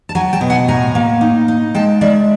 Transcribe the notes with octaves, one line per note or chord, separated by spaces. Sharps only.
A5
F#3 G#5 A#5
G5 A5
B2
F#5 G#5
A2 G#5 A#5
A#3
D#4
D#4
G#3 G5 A5
G#3 D5 E5